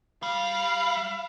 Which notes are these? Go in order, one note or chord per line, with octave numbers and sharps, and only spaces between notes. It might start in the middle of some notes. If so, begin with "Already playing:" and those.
G3 F5